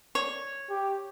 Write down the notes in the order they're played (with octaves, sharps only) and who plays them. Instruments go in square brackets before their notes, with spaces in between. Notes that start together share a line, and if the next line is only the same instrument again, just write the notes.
[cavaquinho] C#5
[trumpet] G4